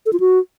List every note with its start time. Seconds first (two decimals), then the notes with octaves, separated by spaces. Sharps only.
0.06 A4
0.13 F4
0.20 F#4